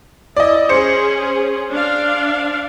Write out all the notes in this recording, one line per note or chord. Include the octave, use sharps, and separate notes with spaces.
E4 D5 D#5
C#4 G#4 C5 C#7
D4 D5 F5